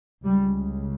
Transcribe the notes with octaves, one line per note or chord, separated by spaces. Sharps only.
C#2 C#3 G3